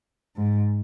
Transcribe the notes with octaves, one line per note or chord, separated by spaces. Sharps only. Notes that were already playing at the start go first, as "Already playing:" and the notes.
G#2